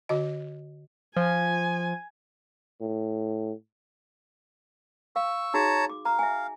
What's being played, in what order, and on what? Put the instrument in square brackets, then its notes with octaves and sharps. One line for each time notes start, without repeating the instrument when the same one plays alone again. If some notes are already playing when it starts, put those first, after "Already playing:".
[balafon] D3 F#4 D#5
[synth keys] F3 [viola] G#5
[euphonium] A2
[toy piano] F5 [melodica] C#6 E6
[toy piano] D#4 F#4 G#4 [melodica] C#5 A5 A#5
[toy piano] D6
[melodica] F5 [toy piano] A#5
[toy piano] E5 G#5